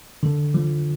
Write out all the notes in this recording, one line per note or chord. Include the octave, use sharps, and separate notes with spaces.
D3
F3